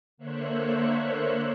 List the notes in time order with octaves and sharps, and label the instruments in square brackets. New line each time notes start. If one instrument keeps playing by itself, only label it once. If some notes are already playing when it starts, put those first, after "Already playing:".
[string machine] D3 A#3 C5 C#5 E5 F#6